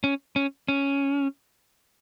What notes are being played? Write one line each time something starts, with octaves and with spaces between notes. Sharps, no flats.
C#4
C#4
C#4